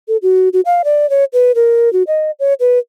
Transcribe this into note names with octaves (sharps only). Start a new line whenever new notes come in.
A4
F#4
F#4
F5
D5
C#5
B4
A#4
F#4
D#5
C#5
B4